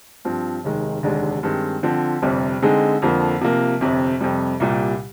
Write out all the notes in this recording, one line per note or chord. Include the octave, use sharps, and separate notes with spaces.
G2 F3 C4
F1 D#2 D#3 G#3
F1 D#2 D3 G#3 D4
G2 D#3 G#3 C4
D3 F3 C4
G1 F2 C3 G3
D3 G#3 C4 D#4 G#4
F2 D3 F3 A#3
C3 F3 A#3
G1 F2 C3
F2 C3 G3
C2 A#2 G3